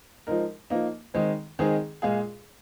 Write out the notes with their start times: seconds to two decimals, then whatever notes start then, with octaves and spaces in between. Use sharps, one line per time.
0.27 F3 G#3 D#4 A#4
0.70 F3 A#3 D#4
1.14 D#3 G#3 C4
1.59 D#3 G#3 C4 D#4 G#4
2.02 A#2 G#3 F4 G#4